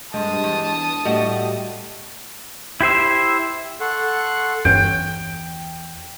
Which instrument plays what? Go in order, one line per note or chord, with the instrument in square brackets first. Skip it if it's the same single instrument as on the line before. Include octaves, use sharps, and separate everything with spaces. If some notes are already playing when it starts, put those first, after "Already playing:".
[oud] G2 [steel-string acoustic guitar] G#3 [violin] A5 D#6
[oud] E2
[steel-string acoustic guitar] A2 D#5 [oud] G3 F#4
[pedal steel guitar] E4 G4 C5 E5
[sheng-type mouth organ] A4 F#5 C6 C#6 F#6
[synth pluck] G1 G2 C#4 [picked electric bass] E2 [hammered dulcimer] G5